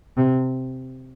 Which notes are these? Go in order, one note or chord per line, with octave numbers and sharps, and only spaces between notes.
C3